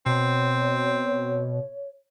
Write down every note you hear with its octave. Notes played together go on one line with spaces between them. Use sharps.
B2 C4 C#5